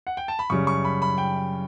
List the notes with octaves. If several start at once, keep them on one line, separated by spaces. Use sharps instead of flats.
F#5
G5
A5
B5
F#2 C#3 G3 C#6
C#6
B5
B5
G5